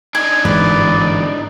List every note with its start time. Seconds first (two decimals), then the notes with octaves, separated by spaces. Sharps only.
0.15 D4 D#4 G#5
0.45 G1 G#2 E3 B4 D5